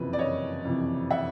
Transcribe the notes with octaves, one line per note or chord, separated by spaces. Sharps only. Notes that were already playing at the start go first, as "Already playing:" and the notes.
Already playing: F#1 F2 C3 E3 B4
D5
F#1 C#5 D#5
F2 C3 E3
E5 F#5